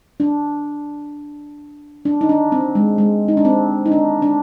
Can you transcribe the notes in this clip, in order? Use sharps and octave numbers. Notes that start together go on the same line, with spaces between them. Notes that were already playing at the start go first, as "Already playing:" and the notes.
D4
D4
D#4
D4
C4
G#3
G#3
D#4
D4
C4
D#4
D4
D4